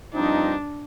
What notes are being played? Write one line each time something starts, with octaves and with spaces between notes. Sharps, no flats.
G2 F3 C4 D4 D#4